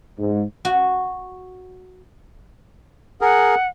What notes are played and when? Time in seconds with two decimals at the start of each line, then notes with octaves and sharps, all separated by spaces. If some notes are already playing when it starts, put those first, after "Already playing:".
0.18 G#2
0.65 F#4
3.21 G#4 A#4 F#5